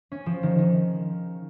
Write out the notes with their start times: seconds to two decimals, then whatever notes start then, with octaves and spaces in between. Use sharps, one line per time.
0.12 C#4
0.26 F3
0.43 D#3
0.58 D#3